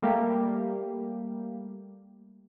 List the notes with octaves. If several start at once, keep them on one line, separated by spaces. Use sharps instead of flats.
G3 A3 A#3 G4